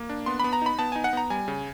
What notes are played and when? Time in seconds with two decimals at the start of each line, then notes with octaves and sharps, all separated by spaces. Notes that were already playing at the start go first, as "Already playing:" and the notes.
Already playing: A#3
0.09 D4
0.26 B3 C6
0.40 B3 B5
0.53 A#5
0.62 D#4 B5
0.79 B3 A5
0.92 D#4 G#5
1.04 F#5
1.13 B3 A#5
1.30 G3 G#5
1.48 C#3